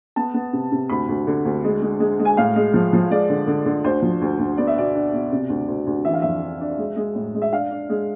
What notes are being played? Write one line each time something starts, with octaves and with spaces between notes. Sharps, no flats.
B3 A5
B3
C3
C3
D2 B5
D2
D3
D2
G#3
G#3
G#3
G#3
G#5
A2 F5
G#3
F3
F3
G#3 D5
D3
D3
D3
D2 C5
F3
D2
D2
B3 D5
E5
B2 D5
D4
B2
C3
D2
D2
D2
E3 E5
F5
F2 E5
D4
D4
G#3
G#3
A2
G#3
E5
D4 F5
D4
G#3